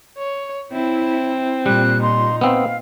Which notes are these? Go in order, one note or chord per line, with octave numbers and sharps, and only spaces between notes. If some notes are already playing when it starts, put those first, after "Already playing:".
C#5
C4 E4
A#2 G3 F#6
D#4 C6
B3 C4 F5